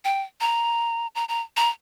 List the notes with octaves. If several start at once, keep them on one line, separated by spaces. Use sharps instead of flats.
G5
A#5
A#5
A#5
A#5